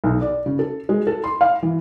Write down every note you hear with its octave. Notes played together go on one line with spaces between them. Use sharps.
B1
D5
C#3
A4
G#3
A4
C6
F5
E3